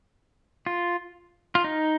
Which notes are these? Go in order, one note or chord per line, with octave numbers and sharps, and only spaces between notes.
F4
F4
D#4